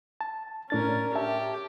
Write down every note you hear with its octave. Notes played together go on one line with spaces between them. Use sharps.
A5
A2 C#4 D4 A#4 A6
G4 E5 A5